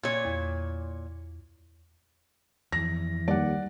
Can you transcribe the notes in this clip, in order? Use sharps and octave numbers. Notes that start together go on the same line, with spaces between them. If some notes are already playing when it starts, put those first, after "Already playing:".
A#2 C#5
E2
F2 E3 A#6
D#2 G3 D5 F#5